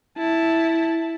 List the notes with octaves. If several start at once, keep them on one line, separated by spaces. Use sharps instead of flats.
E4 A5